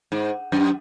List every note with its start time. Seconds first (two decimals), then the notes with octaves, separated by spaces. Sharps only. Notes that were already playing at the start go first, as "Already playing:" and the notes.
0.12 G#2
0.52 F#2